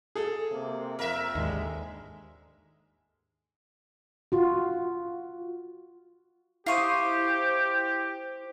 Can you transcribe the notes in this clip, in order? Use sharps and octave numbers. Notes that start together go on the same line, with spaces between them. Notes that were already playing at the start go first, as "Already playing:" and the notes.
G#4 A4
C3 A#3
F2 A#4 E5
D#2 G#2 D3 G#3
F4 F#4
E4 G4 C5 F5 C#6 D#6